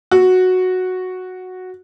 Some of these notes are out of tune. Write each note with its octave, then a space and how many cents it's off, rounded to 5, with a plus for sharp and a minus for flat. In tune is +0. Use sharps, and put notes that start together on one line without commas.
F#4 -5